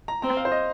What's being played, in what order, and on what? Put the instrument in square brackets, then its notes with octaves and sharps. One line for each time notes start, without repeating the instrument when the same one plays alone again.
[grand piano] A#5
[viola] C4 [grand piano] A#5
[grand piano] F5
C5
D#5